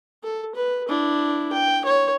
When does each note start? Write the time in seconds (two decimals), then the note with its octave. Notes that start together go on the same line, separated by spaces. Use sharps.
0.24 A4
0.55 B4
0.89 D4 E4
1.53 G5
1.85 C#5